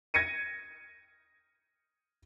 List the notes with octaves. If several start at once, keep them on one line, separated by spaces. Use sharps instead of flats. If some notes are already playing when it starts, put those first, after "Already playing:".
G#6 A#6 C#7 D#7